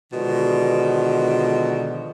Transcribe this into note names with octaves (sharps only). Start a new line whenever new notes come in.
B2 D3 D#3 F3 G#3